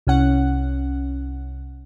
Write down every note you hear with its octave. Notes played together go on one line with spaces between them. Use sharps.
C2 C#4 F#5